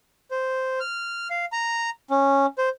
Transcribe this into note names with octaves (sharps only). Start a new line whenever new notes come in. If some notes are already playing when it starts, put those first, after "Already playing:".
C5
F6
F5
A#5
C#4
C5